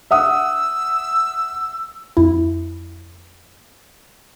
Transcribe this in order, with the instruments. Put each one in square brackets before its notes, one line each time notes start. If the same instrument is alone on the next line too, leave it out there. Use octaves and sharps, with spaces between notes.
[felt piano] E5 F#5 D#6 [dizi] E6
[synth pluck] F2 E4